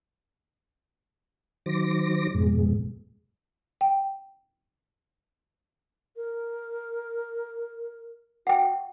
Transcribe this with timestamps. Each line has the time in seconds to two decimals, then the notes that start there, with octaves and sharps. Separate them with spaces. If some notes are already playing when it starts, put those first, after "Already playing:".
1.66 D#3 F#3 C5 D6 A#6
2.34 F2 G#2 B2 G#3
3.81 G5
6.16 A#4
8.47 F#4 F#5 G5